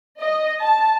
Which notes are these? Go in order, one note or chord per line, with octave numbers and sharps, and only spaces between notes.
D#5
A5